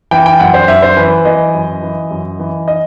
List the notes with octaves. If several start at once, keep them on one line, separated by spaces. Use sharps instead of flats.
E3 G5
G5
F#2 F#5
C5
F#2 E5
C5
E3 B4
E3 D#5
F#2
E3
F#2
E3
D#5